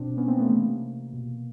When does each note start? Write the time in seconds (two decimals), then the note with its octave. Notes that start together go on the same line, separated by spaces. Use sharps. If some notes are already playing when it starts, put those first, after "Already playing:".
Already playing: B2 C4 D4
0.17 B3 C#4
0.28 A#3 C4
0.38 A3 B3
0.49 C3 E3 A#3
1.13 B2